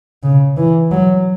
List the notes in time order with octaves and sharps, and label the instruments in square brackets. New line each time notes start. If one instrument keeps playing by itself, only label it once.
[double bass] C#3
E3
F#3